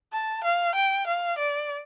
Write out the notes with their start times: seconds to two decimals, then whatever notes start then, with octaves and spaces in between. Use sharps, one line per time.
0.13 A5
0.44 F5
0.75 G5
1.07 F5
1.38 D5